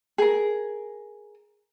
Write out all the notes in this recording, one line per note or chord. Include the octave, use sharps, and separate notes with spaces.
G#4 A#4